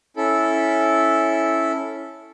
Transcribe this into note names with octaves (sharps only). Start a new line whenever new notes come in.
C#4 E4 A4